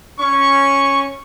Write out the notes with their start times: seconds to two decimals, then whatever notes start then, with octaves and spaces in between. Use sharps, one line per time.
0.20 C#4 C#6